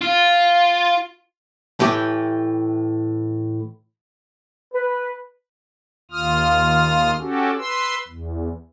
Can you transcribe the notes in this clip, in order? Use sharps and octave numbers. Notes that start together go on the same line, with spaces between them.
F4
A2 E3 G4
B4
D#2 F4 D#6 F6
C#4 F#4 G4 A4
B4 C6 E6
E2